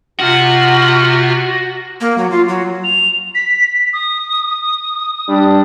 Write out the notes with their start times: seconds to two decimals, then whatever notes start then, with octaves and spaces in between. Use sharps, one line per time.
0.20 C3 F4 F#4 F6
2.01 A#3
2.18 F#3
2.31 F4
2.48 F#3
2.84 F7
3.35 B6
3.93 D#6
5.29 G3 D4